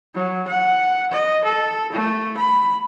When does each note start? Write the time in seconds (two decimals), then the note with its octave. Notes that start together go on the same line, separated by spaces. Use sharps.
0.15 F#3
0.48 F#5
1.11 D#5
1.44 A4
1.92 A3
2.37 B5